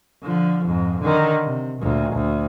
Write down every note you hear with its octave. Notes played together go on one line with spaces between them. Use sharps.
D3 F3
F2 G#2
D3 D#3
C3
D2 A#2
D2